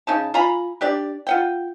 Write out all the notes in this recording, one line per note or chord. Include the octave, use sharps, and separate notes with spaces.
C#3 D#4 A5
F4 G#5 A#5 B5
D4 G4 D5
F4 F#5 G5